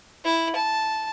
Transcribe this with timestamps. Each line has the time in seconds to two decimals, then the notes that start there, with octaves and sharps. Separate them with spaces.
0.25 E4
0.56 A5